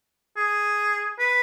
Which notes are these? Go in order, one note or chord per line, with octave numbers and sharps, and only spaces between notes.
G#4
B4